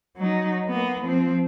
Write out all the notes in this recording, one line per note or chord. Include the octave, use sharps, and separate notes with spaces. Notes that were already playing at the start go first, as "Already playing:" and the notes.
F#3 D#4
A#3 B3
F3 C4